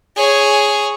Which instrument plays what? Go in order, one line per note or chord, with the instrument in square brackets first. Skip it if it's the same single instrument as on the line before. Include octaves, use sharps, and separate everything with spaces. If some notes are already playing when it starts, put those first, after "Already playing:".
[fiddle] G#4 C#5